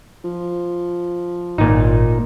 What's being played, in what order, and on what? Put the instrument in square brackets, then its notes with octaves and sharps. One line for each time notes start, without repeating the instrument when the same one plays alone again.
[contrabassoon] F3
[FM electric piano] G#1 [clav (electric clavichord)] A#2 D#4